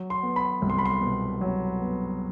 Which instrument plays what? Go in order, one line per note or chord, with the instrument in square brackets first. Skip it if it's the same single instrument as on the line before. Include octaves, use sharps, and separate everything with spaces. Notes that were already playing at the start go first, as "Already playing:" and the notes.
Already playing: [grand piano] F#3
C6
B3
B5
C2
C6
B5
C6
B2
F#3
B3